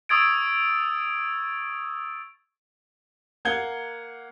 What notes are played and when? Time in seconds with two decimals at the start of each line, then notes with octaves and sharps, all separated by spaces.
0.09 C#6 D#6 E6 G#6 A6 D7
3.45 A#3 F#5 G#6 G7